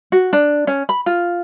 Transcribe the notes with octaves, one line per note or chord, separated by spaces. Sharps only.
F#4
D4
C#4
B5
F4